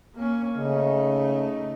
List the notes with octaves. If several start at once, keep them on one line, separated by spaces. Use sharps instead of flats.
A#3 C#4
C#3 A3 D#4